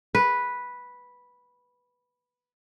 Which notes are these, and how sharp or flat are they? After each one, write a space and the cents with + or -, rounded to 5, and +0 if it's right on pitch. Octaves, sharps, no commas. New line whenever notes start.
B4 -5